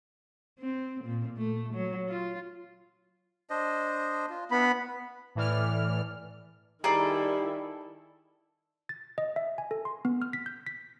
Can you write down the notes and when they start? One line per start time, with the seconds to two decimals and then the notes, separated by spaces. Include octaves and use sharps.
0.59 C4
1.04 A#2
1.37 A3
1.74 F#3
2.08 F4
3.50 D4 C5 D#5
4.30 F4
4.51 B3 D4 E4 B5
5.35 A2 E3 D5 F6
6.84 D#3 G3 E4 G#4 A4 D5 A#5
8.89 A6
9.18 D#5
9.36 E5
9.58 G#5
9.71 A4
9.85 C6
10.05 B3
10.22 F6
10.33 B6
10.46 G6
10.67 B6